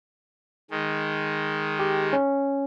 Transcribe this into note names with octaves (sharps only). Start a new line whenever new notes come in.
D#3 G#3
G4
C#4